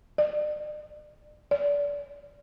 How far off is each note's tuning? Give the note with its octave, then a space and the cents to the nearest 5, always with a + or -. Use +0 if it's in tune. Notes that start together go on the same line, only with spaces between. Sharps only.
D5 +40
D5 -30